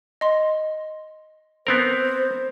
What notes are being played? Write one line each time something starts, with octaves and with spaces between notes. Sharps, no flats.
D#5 C6
B3 C4 A#4 C5